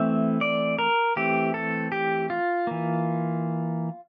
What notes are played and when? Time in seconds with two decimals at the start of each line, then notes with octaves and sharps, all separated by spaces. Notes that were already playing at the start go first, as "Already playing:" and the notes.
Already playing: E3 A3 C4 E5
0.41 D5
0.79 A#4
1.16 E3 A3 C4 G4
1.54 A4
1.92 G4
2.30 F4
2.67 E3 A#3